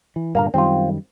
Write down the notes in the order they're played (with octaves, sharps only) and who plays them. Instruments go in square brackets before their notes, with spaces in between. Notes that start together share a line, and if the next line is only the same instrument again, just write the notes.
[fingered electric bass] E3
[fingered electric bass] G2 A#2 D3 [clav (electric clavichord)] A#3 F5 A#5
[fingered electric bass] F#2 D#3 G3 [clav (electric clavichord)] C4 F4